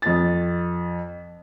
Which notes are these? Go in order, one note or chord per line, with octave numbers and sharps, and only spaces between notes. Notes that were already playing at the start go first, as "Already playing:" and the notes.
F2 A6